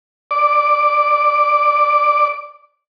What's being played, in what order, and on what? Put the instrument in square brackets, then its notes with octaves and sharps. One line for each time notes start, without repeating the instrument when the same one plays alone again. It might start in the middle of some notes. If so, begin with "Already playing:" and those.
[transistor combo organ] D5 D6